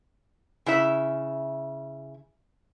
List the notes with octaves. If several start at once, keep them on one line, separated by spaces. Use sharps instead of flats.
C#3 E4 E5